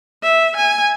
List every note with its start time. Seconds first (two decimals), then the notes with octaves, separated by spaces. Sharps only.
0.22 E5
0.57 G#5